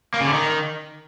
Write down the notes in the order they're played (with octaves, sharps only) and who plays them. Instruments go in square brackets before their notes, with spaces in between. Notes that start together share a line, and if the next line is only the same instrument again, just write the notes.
[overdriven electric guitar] A#3
C#3
D3
D#3